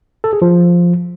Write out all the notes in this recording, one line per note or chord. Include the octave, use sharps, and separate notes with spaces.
A4
G#4
F3